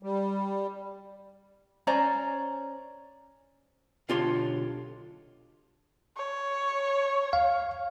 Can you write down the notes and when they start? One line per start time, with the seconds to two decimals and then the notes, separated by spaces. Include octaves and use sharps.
0.03 G3
1.87 C#4 C5 D5 A#5
4.09 B1 D3 F4 G4 C#5 C6
6.17 C#5
7.33 F5